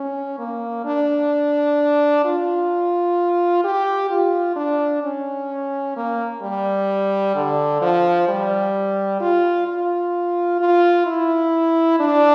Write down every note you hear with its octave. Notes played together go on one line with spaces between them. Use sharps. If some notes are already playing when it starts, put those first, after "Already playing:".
Already playing: C#4
A#3
D4
F4
G4
F4
D4
C#4
A#3
G3
D3
F3
G3
F4
F4
F4
E4
D4